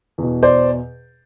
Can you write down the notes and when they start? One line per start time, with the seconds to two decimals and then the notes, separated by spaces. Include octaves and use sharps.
0.18 E2 B2
0.43 C5 D5